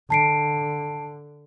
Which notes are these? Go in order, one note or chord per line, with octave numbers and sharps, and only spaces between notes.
D3 A5 C7 D7